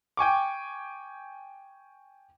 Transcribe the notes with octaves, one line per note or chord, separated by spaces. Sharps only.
G5 G#5 C#6 D6